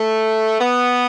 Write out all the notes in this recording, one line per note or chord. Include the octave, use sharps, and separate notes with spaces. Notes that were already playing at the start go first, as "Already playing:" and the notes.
Already playing: A3
B3